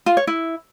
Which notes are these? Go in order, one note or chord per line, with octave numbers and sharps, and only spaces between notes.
F4
C#5
E4